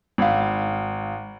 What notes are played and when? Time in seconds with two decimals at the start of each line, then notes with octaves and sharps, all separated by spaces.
0.18 G#1 F5